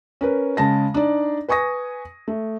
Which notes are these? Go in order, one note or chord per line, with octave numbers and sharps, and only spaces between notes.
C#4 A#4 B4
C#3 G#3 A5 A#6
D4 D#4 D5
B4 G#5 C#6 D#6 A#6
A3